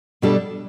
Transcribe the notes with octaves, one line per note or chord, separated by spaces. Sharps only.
B2 G3 D4 A4